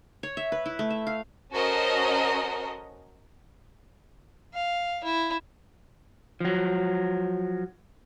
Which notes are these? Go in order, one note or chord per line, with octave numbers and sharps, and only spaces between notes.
C#5
E5
B4
E4
A3
E5
F5
C#4 F#4 A4 A#4 C5 D#5
F5
E4
F3 F#3